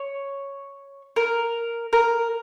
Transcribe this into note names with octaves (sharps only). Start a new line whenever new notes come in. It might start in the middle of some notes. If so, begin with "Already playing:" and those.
Already playing: C#5
A#4
A#4